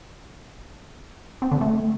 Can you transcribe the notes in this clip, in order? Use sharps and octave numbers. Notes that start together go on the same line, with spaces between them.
C4
D3
A3